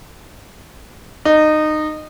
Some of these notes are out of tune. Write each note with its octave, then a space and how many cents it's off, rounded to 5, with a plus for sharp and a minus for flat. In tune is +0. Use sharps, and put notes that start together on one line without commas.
D#4 -20